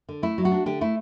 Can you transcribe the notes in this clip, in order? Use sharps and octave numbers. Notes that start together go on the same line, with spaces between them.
D3
A3 E4
F#3
F#4
D4
D3 G4
A3 E4